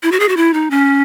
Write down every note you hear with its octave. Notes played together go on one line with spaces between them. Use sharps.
E4
F#4
G#4
F#4
E4
D#4
C#4